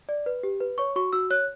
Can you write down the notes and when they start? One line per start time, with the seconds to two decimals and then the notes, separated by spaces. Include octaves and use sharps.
0.09 D5
0.26 B4
0.43 G4
0.60 B4
0.78 C#5 C#6
0.96 F#4 C#6
1.13 F#4 E6
1.31 C#5 F#6